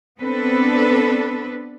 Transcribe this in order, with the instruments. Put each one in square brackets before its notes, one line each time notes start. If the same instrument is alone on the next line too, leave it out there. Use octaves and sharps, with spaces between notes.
[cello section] B3 C4 D4 A4 B4